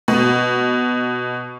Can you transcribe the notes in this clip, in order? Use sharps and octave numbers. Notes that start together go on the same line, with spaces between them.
B2